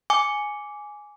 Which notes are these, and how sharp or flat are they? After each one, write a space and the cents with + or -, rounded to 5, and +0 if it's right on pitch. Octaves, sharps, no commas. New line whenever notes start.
G#5 +0 D6 -15